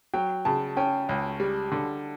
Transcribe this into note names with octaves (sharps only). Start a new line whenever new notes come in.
F#3 G5
C#3 A5
C#4 G5
C#2
G3
D3